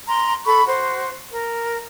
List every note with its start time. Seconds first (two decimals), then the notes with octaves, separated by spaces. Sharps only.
0.08 A#5 C6
0.46 A4 B5 C#6
0.66 F#4 C5
1.31 A#4